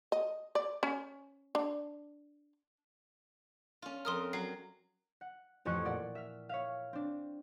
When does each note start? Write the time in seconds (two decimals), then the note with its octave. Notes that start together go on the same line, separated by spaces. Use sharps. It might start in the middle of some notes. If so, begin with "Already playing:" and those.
0.12 D#5
0.55 D5
0.83 C#4
1.55 D4
3.82 C#4 F4
4.05 F2 A#4 C6 D#6 F6
4.33 F#3 C7
5.21 F#5
5.65 A1 F2 G#5 C#6 F#6 C#7
5.85 A#2 D5 F#5
6.15 E5 F6
6.49 C#5 E5 F5
6.93 C4 D4